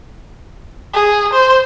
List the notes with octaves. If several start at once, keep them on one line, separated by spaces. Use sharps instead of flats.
G#4
C5